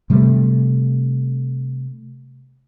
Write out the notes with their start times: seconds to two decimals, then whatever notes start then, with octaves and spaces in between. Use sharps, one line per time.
0.10 C3 G3 A3